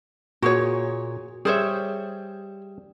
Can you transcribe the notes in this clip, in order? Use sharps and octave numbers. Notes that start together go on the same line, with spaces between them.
A#2 F#4 G#4 C#5
G3 G#4 C5 C#5 E5